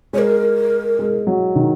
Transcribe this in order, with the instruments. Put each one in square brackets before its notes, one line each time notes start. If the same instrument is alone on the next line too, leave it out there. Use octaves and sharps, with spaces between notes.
[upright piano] G#3 [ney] C#5
[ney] A#4
[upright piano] G#3
F#3
D#3